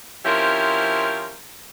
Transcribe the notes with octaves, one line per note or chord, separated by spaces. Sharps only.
F3 C4 C#4 E4 G4 A#4